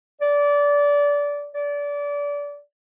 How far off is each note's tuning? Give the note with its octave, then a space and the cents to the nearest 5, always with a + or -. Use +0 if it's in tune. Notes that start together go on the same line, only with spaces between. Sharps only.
D5 -20
D5 -25